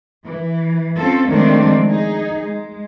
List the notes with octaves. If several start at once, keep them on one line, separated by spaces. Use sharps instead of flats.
E3
C4 C#4 F4 A4
D#3 F3 G#3 A3 C4 D4
D#4 G#4
G#3